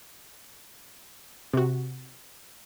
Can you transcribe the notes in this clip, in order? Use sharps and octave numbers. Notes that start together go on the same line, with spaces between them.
C3 F#4